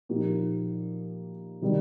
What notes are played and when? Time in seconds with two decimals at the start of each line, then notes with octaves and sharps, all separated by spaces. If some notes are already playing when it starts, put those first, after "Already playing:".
0.09 A#2 F3 A#3 D#4 G4
1.61 C3 D#3 G3